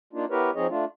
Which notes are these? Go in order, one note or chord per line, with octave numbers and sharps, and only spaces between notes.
A#3 D4 D#4 F4
B3 E4 G4 A#4 B4 C#5
F3 C4 D#4 G#4 C#5 D#5
A3 D4 F4